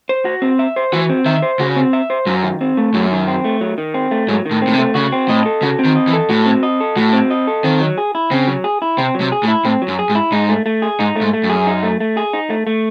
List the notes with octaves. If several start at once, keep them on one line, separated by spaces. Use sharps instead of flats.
C5
F#4
C4
E5
C5
E3 F#4
C4
D#3 E5
C5
C#3 F#4
C4
E5
C5
F#2 F#3
D#3
C4
A3
F#2 F#3
D#3
C4
A3
F#3
D#3
C4
A3
G#2 F#3
D#3
A2
C4
A2
C3
A3
C#3 F#4
C4
A2 D#5
A4
C#3 F#4
C4
D#3
D#5
E3
A4
A2 F#4
C4
D#5
A4
A2 F#4
C4
D#5
A4
D#3 C4
F#3
G#4
E4
C#3 C4
F#3
G#4
E4
C3 C4
F#3
C3
G#4
A2
E4
A2 C4
F#3
F#2
G#4
G#2
E4
G#2 D#4
A3
A3
G#4
G#2 D#4
A3
G#2
A3
F#2
G#4
D#4
A3
A3
G#4
D#4
A3
A3